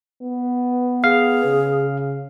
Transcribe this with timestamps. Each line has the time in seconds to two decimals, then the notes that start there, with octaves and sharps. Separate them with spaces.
0.22 B3
1.04 G#4 F5
1.45 C#3